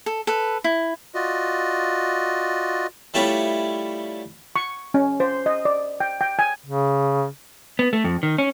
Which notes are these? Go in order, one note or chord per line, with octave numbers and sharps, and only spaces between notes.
A4
A4 B4
E4
F4 F#4 D5 D#5
G3 A3 E4 F4 G4 C#5
C#6
C#4
C5
D#5
D5
G5
G5
G#5
C#3
B3
A3
F2
D#3
C#4